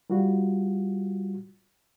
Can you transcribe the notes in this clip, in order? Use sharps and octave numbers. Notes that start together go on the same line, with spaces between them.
G3 F4 F#4